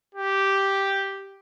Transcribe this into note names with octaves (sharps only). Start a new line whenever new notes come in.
G4